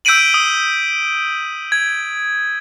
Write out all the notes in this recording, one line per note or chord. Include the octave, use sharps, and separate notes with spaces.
E6 G6 B6 D7 D#7 F#7
D#6
G#6